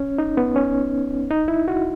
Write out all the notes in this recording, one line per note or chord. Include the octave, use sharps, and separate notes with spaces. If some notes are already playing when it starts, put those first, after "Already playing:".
Already playing: C#4
D#4
B3
C#4
D#4
E4
F#4